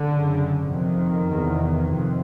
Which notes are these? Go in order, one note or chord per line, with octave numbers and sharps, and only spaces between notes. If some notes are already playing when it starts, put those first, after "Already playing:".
Already playing: D3
F#2 C#3
F2 C3 D#3
E2 C3
F2 C3